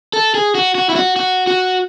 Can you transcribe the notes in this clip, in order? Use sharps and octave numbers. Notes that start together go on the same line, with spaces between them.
A4
G#4
F#4
F#4
E4
F#4
F#4
F#4